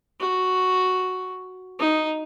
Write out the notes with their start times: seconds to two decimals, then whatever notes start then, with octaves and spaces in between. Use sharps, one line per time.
0.20 F#4
1.79 D#4